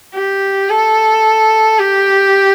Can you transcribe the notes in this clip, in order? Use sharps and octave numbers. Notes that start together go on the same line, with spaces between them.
G4
A4
G4